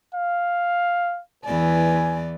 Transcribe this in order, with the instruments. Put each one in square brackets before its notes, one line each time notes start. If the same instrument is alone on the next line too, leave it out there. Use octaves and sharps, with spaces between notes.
[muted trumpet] F5
[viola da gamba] E2 E3 D5 [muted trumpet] G#5